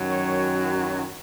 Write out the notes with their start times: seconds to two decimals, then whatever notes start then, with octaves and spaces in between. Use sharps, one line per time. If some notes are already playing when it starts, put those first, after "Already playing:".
Already playing: F#2 D#3 F#3
0.10 C#5